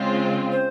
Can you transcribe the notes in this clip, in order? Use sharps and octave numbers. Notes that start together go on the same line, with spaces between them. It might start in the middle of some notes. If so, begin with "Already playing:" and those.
Already playing: C#3 G#3 C4 F4
C5